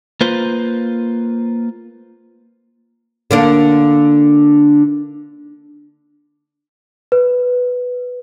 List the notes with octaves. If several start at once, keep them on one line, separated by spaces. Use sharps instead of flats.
A#3 F4 B4 C5
D3 A#3 D4
B4